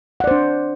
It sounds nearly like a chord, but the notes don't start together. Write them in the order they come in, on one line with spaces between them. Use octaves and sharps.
F#5 D5 C5 D4